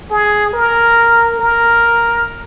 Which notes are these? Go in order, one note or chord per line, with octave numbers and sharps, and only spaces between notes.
G#4
A#4
A#4